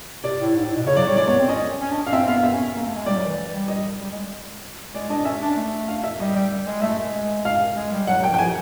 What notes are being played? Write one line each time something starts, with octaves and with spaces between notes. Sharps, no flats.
C3 D5
A2
G#2
A2
B2
C#3 C#5
F#3 D5
G3 C#5
G#3 D5
B3 C#5
C4
C#4 D#5
C#4
D4
C#4
F5
C4 E5
B3 F5
B3 E5
C#4
A#3
A3
G#3
G3 D5
F#3
E3
G3
D#5
G3
G#3
G#3 D5
D4 D#5
C#4 E5
D4
A3
F5
E5
G3 D#5
G3
G#3
A3 E5
G#3
F5
G#3
G3
F#3 F#5
F#3
G5
F3
G5
F3 G#5